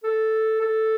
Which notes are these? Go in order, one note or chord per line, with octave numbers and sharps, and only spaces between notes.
A4
A4